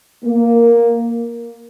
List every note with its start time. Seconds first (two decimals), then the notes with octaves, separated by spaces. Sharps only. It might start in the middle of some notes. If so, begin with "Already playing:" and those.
0.24 A#3